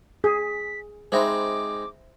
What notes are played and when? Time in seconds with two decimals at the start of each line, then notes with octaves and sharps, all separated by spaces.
0.24 G#4 B6
1.12 G#3 C4 D#4 C5 E5 B5 D6